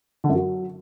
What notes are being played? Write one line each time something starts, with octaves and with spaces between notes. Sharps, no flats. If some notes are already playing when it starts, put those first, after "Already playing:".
D3
F#2
F#3